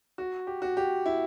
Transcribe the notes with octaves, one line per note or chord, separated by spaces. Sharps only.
F#4
G4
F#4
G4
E4